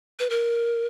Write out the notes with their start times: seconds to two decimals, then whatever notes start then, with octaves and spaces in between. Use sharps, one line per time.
0.19 B4
0.30 A#4